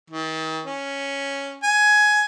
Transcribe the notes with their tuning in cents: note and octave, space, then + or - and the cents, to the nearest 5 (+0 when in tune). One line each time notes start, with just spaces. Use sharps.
D#3 +40
C#4 +0
G#5 +15